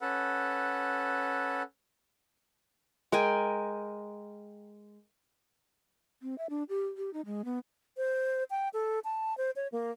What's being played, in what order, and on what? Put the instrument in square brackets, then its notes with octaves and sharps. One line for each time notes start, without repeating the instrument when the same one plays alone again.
[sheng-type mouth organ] C#4 A4 B4 F#5
[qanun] G#3 A#4 G5 G#5
[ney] C4
E5
D4
G4
G4
D#4
G#3
B3
[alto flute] C5
G5
A4
A5
C5
C#5
A#3